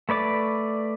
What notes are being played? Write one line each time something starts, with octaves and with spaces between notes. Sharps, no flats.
A3 B4 D5 D6